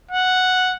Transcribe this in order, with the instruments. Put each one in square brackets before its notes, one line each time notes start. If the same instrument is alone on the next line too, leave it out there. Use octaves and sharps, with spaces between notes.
[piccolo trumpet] F#5